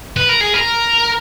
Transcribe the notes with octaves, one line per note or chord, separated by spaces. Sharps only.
B4
A#4
G#4
A#4